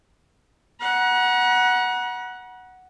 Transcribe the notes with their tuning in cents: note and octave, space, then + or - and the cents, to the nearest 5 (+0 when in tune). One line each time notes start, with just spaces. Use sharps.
F#5 +0 A#5 +45